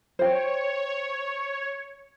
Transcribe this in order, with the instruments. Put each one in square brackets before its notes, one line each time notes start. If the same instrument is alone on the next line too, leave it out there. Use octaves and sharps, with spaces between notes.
[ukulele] C5 G5 [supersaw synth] C#5